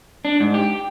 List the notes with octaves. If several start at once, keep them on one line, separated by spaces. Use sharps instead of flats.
D4
G#2
G4